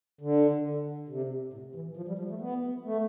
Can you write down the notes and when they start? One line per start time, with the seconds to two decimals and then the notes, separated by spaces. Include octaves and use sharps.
0.21 D3
1.09 C3
1.53 A2
1.75 E3
1.97 F3
2.08 G3
2.19 F3
2.29 A3
2.41 B3
2.84 A3